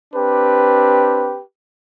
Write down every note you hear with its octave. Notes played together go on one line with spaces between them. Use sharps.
C4 D4 G4 B4